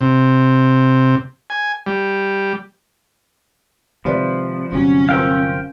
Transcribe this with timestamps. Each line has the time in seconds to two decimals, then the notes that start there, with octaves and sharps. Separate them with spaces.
0.01 C3
1.50 G#5
1.86 G3
4.05 G#1 C3 F3 B4 D5
4.73 G1 C3 F#3 C#4
5.09 F4 A#4 C5 F5 G5 E6